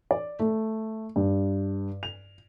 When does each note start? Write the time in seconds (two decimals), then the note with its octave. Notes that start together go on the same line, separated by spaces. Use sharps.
0.11 D5
0.40 A3
1.16 G2
2.03 F7